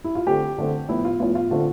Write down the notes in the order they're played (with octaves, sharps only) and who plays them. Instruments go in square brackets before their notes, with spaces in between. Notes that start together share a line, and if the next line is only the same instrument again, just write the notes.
[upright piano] E4
F4
D3 A3 C4 G4
D3 A3 C4
A2 F3 B3 E4
F4
A2 F3 B3 F4
F4
D3 A3 C4 F4